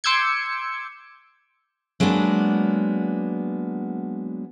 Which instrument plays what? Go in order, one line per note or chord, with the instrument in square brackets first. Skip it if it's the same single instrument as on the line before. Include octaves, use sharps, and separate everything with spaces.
[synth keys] C6 D6 E6 G6 G#6 C#7
[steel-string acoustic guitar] F#3 G#3 A#3 B3 D4